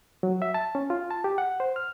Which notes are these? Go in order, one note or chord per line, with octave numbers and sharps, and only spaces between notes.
F#3
E5
A5
C#4
F4
A5
G4
F#5
C5
F6